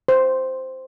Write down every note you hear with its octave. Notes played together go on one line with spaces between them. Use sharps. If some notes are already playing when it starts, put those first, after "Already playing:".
C5